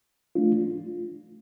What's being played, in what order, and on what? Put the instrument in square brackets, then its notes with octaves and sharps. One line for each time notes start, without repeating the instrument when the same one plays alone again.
[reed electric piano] A3 D4 F4